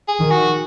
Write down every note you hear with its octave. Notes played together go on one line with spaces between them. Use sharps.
G#4
D#3
F#4